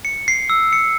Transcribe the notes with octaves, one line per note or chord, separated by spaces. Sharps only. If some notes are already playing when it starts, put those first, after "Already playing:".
C#7
C7
E6
C#7